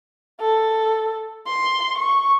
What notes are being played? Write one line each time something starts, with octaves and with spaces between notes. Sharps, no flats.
A4
C6
C#6